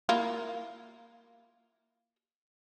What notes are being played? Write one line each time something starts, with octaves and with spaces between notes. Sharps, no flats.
A#3 E4 F4